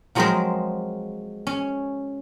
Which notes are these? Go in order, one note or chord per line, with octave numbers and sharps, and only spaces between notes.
F3 F#3 G#3 C4 A#4 C5
C#4